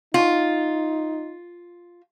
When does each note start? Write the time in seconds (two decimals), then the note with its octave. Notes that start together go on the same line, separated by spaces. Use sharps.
0.14 D#4 F4